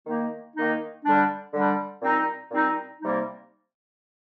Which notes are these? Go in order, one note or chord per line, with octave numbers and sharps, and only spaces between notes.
D#3 A#3 D#4
D#3 A#3 D#4
D3 G3 D4
D3 G3 D4
A#2 G3 C4 D#4
A#2 G3 C4 D#4
C3 G3 A#3 D#4